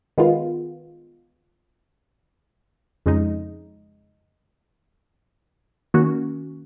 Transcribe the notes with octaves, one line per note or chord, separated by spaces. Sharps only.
D#3 G#3 B3 F4
F2 C#3 G#3 D#4
D#3 A#3 C#4 F#4